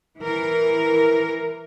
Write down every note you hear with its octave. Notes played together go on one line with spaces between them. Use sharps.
E3 A#4